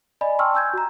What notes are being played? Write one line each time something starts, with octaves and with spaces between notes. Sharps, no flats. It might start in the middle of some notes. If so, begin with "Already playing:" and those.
D5 D#5 G#5 B5
G5 A5 C6 C#6 E6 F6
G#5 E6 G6 G#6
F#4 A#5